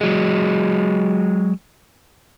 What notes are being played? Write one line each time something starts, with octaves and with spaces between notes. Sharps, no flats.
F#3 G#3